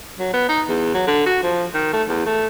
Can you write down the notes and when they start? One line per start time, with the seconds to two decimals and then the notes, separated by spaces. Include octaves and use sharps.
0.19 F#3
0.33 B3
0.49 D#4
0.69 E2
0.94 F#3
1.07 D3
1.26 F#4
1.43 F3
1.74 D#3
1.93 A3
2.09 E2
2.26 A3